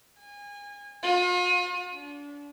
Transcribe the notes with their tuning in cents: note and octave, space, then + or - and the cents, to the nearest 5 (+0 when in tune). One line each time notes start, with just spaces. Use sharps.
G#5 -30
F4 +45
D4 -30